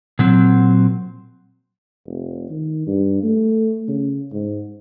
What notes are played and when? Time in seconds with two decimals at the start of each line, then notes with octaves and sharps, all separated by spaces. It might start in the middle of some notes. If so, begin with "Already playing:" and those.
0.19 A#2 F#3 C4
2.06 F1
2.49 D#3
2.87 G2
3.23 A3
3.88 C#3
4.33 G#2